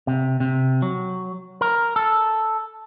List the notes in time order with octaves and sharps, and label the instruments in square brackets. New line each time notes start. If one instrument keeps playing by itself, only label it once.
[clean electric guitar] C3
C3
F#3
A#4
A4